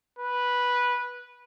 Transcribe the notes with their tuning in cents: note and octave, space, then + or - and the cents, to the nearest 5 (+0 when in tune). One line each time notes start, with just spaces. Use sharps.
B4 -10